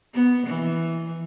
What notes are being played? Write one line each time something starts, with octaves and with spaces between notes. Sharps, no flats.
B3
E3